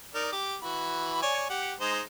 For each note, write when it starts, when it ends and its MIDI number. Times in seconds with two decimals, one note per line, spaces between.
0.15 0.31 63
0.15 0.31 70
0.15 0.31 74
0.33 0.56 67
0.33 0.56 86
0.63 1.22 52
0.63 1.22 66
0.63 1.22 83
1.22 1.47 73
1.22 1.47 74
1.22 1.47 80
1.50 1.74 67
1.50 1.74 78
1.81 2.01 56
1.81 2.01 63
1.81 2.01 72